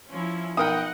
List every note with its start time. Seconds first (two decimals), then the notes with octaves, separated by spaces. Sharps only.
0.10 F3 C#4 E4
0.57 B1 A#4 D#5 F#5 G5 D#6